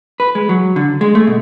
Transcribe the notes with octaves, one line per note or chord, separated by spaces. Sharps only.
B4
G#3
F#3
D3
G#3
A3
B2